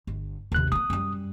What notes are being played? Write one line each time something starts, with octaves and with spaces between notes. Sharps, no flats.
G1
G#1 D#2 C3 F#6
A#3 B3 D#6
F#2 G3